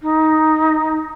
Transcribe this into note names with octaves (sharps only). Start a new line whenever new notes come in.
D#4